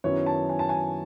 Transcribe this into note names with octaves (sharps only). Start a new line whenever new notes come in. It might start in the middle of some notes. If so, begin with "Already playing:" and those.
F#2 D#3 F#3 B3 E4 C#5
A5
G#5
A5
G#5